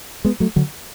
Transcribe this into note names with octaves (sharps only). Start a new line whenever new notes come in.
G#3 B3
F#3 A3
D3 F#3